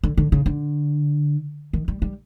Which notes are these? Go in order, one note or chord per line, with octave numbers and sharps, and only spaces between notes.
D3
D3
C#3
D3
D#3
G3
G3